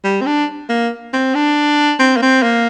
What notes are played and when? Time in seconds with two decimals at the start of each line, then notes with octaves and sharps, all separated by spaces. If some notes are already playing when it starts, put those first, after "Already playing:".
0.04 G3
0.21 C4
0.26 D4
0.69 A#3
1.13 C4
1.35 D4
1.99 C4
2.17 A#3
2.22 C4
2.43 A#3